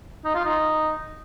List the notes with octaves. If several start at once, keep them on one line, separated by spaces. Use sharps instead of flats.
D#4
F4
D#4